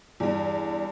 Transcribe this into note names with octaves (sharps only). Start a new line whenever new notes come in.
E2 G2